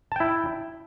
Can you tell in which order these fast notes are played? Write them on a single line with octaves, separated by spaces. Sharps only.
A5 G5 E4